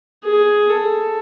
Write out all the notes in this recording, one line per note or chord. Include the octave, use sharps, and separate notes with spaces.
G#4
A4